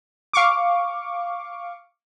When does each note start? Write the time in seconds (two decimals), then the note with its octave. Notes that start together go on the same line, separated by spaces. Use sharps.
0.33 F5 C#6 D6